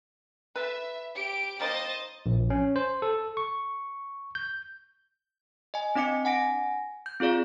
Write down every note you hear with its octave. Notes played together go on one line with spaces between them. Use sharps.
A4 B4 E5
G4 D7
G3 A#3 D#4 C5 D#5 A6
A#1
C#4
C5
A4
C#6
G6
D#5 G#5
C4 D4 D#5 D6 C#7
F#5 G#5 A#6 D7
G6
C4 F4 G#4 D5 F5